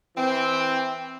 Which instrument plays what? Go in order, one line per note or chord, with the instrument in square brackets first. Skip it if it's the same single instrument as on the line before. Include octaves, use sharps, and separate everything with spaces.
[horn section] E3 C4